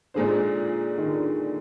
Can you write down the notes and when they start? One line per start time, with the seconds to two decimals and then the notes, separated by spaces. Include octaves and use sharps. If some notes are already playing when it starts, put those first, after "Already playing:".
0.14 A#2 D3 G#3 D#4 G#4 C5
0.98 D#3
1.05 D3